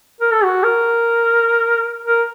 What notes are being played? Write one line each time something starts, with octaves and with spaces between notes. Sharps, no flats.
A#4
A4
F#4
A#4
A#4